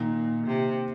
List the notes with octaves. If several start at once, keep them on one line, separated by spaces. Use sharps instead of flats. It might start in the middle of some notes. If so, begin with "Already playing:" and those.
Already playing: A#2 D#3 A#3 D#4
C3